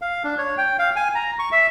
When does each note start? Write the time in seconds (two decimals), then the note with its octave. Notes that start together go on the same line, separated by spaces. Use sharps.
0.02 F5
0.24 D4
0.38 C#5
0.58 G5
0.79 F5
0.96 G#5
1.15 A#5
1.39 C#6
1.52 E5